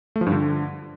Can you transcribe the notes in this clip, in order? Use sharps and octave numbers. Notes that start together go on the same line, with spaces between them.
A3
F3
G2
D3